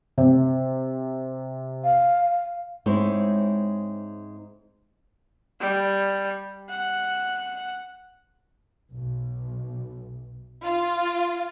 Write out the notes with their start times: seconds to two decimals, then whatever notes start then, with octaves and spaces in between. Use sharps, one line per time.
0.18 C3
1.84 F5
2.86 G#2 G#3 C4 E4 C#5
5.60 G3
6.69 F#5
8.92 B1
10.63 F4